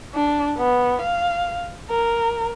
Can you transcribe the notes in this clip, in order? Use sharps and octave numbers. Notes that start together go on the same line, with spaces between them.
D4
B3
F5
A#4